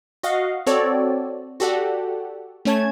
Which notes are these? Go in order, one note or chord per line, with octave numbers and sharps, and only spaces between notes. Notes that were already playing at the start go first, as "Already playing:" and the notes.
F#4 D#5 F5 F#5
C4 F#4 A4 C#5 D5
F#4 G4 A4 D5 F#5
A3 C#4 C#5 A5 G#6